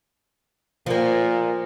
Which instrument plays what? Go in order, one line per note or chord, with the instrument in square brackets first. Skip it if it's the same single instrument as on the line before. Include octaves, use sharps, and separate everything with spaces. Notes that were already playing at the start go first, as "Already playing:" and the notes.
[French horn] A#2 [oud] F3 A#3